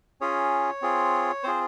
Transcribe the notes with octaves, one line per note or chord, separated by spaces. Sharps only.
C#4 F4 G#4 C#5
C4 F4 G#4
C4 F4 G#4 C5